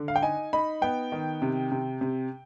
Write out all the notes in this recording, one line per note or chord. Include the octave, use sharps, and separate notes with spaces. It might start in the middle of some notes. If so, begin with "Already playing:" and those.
Already playing: D3
F5
G5
D#4 G#5
D#4 B5
B3 G5
D#3
C3
C3
C3